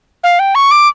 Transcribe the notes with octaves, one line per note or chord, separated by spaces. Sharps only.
F5
G5
C#6
D6